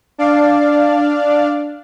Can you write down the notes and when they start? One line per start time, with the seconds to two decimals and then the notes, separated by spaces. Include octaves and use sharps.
0.18 D4 D5 F5